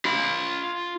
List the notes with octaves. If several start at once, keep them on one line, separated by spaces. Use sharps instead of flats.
F4 B5